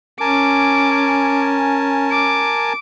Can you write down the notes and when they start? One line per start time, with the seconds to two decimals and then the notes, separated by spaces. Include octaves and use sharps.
0.20 C#4 A#4 G#5 A5 D6
2.12 D6